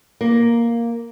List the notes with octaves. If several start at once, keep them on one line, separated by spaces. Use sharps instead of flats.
A#3